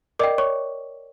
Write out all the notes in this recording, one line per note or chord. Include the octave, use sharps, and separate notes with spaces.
A#4 D5 D#5 G5 D6
C#5 C#6